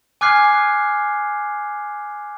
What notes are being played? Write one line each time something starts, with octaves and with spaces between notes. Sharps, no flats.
G#5 D6 F6 F#6 G#6 C7